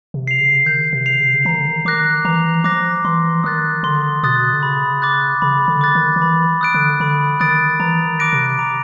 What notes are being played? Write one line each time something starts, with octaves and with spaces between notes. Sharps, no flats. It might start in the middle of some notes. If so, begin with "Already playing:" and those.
C3
C7 F7
C#3
D#3 G6
C3
C7 F7
C#3
C3
C#3
E3 A#5
D#3
D3
D#3
D#3 D6 F#6 A#6
E3 A#5
F3 D6 F#6 A#6
E3 C6
D#3 D#6 F#6 A6
D3 C6
B2 D#6 F#6 A6
D3
C#3 B5
D6 F#6 A6
C#3 B5
D3
D6 F#6 A6
D#3
D#3
E3 B5
D#6 F#6 A6 D7
D3
D3 B5
D#3 D#6 F#6 A6 D7
E3 A#5
D#3
D6 F#6 A#6 D7
C3
A#5